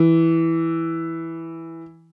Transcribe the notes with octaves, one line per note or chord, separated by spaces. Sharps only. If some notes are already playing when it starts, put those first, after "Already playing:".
Already playing: E3